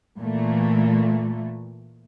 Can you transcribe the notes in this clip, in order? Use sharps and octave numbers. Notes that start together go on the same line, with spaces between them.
A#2 E3 A3